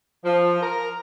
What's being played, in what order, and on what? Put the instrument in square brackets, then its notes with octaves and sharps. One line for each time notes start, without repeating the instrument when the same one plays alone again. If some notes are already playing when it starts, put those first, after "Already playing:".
[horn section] F3
A#4